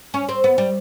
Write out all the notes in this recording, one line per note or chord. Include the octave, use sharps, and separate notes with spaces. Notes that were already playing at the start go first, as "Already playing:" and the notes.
C#4
C4
B3
G3